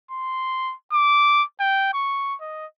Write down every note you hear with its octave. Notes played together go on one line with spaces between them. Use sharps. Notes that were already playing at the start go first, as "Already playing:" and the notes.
C6
D6
G5
C#6
D#5